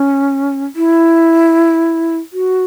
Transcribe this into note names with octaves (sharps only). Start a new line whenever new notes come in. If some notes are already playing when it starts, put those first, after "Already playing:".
Already playing: C#4
E4
F#4